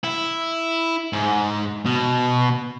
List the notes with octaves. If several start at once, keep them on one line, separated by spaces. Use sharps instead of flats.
E4
G#2
B2